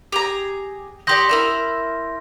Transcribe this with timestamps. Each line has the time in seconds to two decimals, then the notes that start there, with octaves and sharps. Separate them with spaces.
0.12 G4 G#4 A#5
1.07 D#4 G4 D5 C6 G6 A#6
1.29 E4 A#4 E5